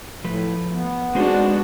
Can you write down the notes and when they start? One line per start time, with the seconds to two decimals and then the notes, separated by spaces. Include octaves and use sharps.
0.24 A2 F3 A3 B4
0.73 B3
1.15 G#3 C4 D4 D#4 F#4 C5